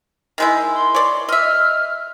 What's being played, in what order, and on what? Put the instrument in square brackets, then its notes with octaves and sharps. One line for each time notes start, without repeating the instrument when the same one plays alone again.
[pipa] D#3 G#3 E4
[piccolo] C6
[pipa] C#5 D5
[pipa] D#5 E5 [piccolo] F6